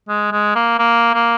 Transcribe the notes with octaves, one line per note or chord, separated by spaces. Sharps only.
G#3
G#3
A#3
A#3
A#3